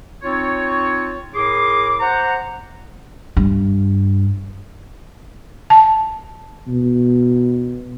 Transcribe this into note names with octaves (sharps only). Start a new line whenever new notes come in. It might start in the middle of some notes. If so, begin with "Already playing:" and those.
C4 D#4 F4 C#5
A2 G#4 A#4 C6 D6
C5 F#5 A#5
G2
A5
B2